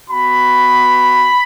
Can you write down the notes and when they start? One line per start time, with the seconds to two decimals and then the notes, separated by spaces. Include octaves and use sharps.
0.10 B3 F#4 B5